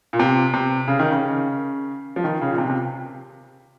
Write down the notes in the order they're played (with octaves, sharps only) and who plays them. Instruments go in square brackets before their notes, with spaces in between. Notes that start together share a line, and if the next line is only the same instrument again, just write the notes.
[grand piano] A#2
C3
C3
C#3
D#3
C#3
F3
D#3
C#3
A#2
C3
C3